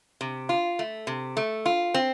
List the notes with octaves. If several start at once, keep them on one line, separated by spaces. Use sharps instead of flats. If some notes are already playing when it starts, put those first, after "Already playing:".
C3
F4
A3
C3
A3
F4
C4